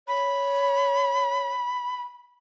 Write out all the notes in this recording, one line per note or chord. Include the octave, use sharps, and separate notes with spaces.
C#5 B5